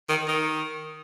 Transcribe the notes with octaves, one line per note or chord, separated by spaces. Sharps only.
D#3
D#3